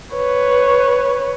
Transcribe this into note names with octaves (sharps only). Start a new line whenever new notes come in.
B4 C#5